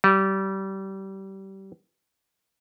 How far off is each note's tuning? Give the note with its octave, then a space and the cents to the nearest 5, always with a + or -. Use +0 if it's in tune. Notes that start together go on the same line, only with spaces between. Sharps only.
G3 -25